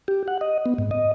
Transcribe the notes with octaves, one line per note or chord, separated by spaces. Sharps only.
G4
F#5
D#5
B3
G#2
D#5